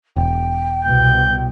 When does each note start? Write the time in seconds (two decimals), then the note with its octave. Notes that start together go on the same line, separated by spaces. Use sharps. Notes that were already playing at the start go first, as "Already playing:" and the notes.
0.16 E1 G5
0.85 C2 B2 G6